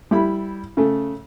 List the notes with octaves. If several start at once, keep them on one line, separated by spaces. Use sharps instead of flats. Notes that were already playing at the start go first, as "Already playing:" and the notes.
G3 E4 B5
C#3 A3